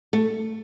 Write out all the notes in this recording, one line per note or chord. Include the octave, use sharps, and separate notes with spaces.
A3